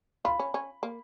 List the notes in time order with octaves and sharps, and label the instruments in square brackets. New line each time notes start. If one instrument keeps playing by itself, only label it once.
[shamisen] F4 [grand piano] B5
[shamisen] C#4
C#4
A#3